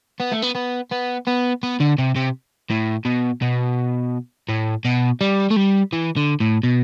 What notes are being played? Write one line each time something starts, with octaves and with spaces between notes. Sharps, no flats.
B3
A3
B3
B3
B3
B3
B3
D3
C3
C3
A2
B2
B2
A2
B2
G3
A3
G3
E3
D3
A2
B2